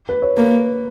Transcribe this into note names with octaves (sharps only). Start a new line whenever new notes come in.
B4
C#5
A#3 B4